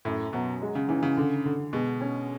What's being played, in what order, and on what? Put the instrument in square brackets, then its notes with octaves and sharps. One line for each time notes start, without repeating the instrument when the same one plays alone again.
[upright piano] F#2 [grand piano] A2
[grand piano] B2 [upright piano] F#3
[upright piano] G#3
[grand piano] C#3
[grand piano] C#3 [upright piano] E3
[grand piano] C#3
[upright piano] D3
D3
[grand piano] B2 [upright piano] G#3
[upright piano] C#4